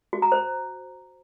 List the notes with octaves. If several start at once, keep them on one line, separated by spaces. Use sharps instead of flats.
F#4
A#5
C5